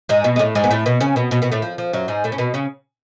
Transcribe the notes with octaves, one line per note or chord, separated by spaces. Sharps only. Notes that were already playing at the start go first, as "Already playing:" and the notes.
G#2 G#3
B2 B3
G#3
A2 A3
G#2 G#3
B3
A2 A3
B2 B3
C#3 C#4
B2 B3
B2 B3
B2 B3
A2 A3
F3
F3
F#2 F#3
G#2 G#3
A2 A3
C#4
B2 B3
C#3 C#4